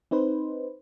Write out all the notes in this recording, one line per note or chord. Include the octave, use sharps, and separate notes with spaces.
C4 D#4 B4 C5